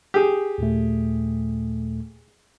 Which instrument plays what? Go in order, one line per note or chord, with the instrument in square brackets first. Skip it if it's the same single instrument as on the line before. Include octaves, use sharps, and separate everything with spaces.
[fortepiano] G4 G#4
[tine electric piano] D#2 A#2 A3